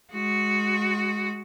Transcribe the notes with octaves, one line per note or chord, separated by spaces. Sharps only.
G#3 F#4